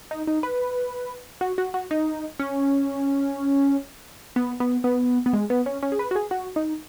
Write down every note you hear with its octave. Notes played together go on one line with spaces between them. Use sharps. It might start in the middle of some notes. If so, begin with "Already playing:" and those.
D#4
D#4
B4
F#4
F#4
F#4
D#4
C#4
B3
B3
B3
B3
G#3
B3
C#4
C#4
G#4
B4
F#4
G#4
F#4
D#4